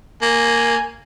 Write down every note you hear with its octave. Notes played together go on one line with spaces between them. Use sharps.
A#3 G#5